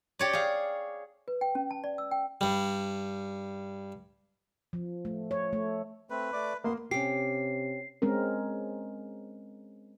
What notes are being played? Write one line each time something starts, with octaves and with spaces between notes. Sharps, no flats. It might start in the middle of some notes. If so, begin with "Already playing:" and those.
G4 C#5 D5
G#4 F5
B4
G5
C#4
A5
D5
E6
G5
G2 G3
F3
A3
C#5
A3
A3 C4 B4
A3 D5 D6
A#3 B3 C6
C3 C#4 G4 C7
G#3 C4 C#4 A#4